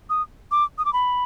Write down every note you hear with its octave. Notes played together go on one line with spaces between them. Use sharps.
D#6
D6
D#6
D6
B5